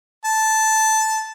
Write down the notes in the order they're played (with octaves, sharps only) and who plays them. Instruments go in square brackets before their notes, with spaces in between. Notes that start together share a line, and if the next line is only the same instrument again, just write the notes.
[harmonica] A5